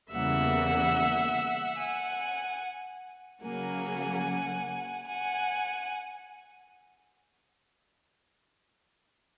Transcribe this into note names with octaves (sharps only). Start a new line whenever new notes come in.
E2 C#3 E3 G3 A#3 E5 F#5
F#5 G#5
C#3 F#3 A#3 F#5 G#5
F#5 G#5